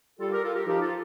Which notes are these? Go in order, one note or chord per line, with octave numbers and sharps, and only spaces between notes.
G3 F4 A4
G4 A#4
F4 A4
G4 A#4
F3 D#4 G4
F4 A4